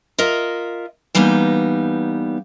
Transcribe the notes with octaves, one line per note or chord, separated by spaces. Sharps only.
F4 A#4 D#5 E5
E3 G3 A#3 B3 D#4